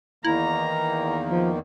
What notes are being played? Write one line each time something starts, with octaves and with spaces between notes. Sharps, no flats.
E2 D#3 A#3 E4 A#5
F3